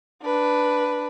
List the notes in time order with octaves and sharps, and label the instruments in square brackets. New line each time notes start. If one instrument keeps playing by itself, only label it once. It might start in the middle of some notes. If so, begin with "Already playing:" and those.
[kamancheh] D4 B4